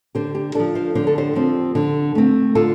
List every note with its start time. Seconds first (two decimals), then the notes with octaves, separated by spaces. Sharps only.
0.15 D3 G4 C5
0.35 G4
0.55 F3 D4 A4 D5
0.75 C5 F5
0.95 D3 C5
1.07 A4
1.18 G4 C5
1.35 F3 C4
1.75 D3
2.15 A3 C4
2.55 D3 F4 A4